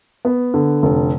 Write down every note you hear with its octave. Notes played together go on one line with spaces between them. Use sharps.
B3
D3
F1